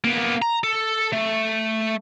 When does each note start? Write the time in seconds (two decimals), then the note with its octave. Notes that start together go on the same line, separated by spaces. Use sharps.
0.04 A#3 B3
0.42 A#5
0.64 A4
1.13 A3